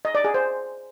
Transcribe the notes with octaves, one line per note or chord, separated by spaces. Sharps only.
D#5
D5
G#4
C5